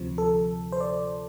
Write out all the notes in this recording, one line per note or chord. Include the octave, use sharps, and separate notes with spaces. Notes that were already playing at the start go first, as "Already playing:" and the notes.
Already playing: D2 C3 F3
A4
C5
D5